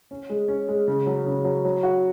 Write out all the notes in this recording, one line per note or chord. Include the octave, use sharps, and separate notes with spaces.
C#4
G#3
C#4
G#3
C#3
F#3
C#3
F#3
F#3
F#4